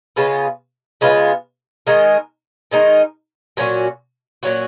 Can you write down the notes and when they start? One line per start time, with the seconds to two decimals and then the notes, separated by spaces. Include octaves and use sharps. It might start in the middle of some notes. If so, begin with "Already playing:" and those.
0.16 C#3 G#3 B3 F4
1.01 C#3 G#3 B3 F4
1.87 D#3 G#3 D#4 A#4
2.72 D#3 G#3 D#4 A#4
3.57 A#2 F#3 C#4 F#4
4.43 A#2 F#3 C#4 F#4